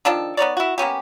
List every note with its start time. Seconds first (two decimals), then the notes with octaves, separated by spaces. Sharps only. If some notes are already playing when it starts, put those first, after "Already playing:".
0.05 D#3 F3 D4 A4
0.37 B3 D#4 C#5 D5
0.57 E4 F#4
0.78 A#3 B3 C#4 G4